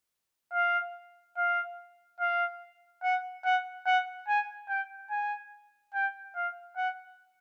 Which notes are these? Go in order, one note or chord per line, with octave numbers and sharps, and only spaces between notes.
F5
F5
F5
F#5
F#5
F#5
G#5
G5
G#5
G5
F5
F#5